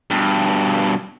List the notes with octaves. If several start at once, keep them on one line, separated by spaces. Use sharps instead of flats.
G2 B2